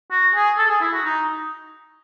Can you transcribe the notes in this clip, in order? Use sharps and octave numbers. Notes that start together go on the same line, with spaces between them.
F#4
G#4
A4
G#4
E4
F#4
D#4